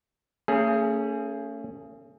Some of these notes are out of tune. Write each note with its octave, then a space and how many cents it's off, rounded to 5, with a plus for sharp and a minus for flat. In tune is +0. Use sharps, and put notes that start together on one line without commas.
A3 +45 C#4 +10 G#4 +5